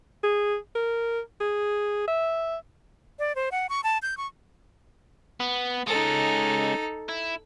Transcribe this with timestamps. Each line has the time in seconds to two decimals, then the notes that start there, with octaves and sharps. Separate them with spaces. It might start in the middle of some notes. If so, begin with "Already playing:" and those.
0.24 G#4
0.75 A#4
1.41 G#4
2.08 E5
3.19 D5
3.35 C5
3.52 F#5
3.69 C#6
3.84 A5
4.02 G6
4.17 C#6
5.40 B3
5.87 G#3 C#4 D#4 A4
7.09 E4